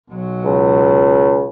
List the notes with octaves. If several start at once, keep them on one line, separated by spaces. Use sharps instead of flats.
B1 F#3
C#2